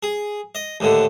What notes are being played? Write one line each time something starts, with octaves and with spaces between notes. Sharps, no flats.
G#4
D#5
D#2 A2 D3